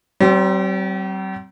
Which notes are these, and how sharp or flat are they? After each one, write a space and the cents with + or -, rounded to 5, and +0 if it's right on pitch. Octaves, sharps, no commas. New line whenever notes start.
G3 -45 C4 +0